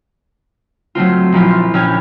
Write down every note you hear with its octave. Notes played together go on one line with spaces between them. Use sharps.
F#3 A3 C4 F4
A#1 F3 E4 F4
A#1 C#4 G4 F6 G#6